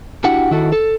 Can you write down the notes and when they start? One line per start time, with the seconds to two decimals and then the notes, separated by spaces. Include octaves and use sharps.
0.24 D4 E4 F#4 G4 F#5
0.51 D#3 E4 F#4 A4
0.72 A4